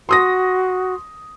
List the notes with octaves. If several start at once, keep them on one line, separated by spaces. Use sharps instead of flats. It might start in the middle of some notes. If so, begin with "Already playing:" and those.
F#4 C6 D#6 A#6